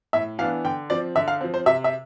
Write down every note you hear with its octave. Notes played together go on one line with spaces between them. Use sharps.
A2 E5
E3 B3 D4 F5
D3 G5
F3 C4 D5
D3 E5
F5
F3 C4
C5
C3 E5
E5